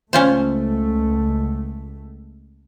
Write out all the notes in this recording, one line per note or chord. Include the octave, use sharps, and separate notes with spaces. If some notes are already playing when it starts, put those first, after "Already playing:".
C#2 A3 C#4 F4 C5